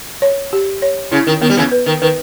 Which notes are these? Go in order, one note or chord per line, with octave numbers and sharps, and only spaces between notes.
C#5
G4
C#5
C#3 E4
D#3
D#3 B3
G3
C#3 E3
B4
D#3
D#3 B4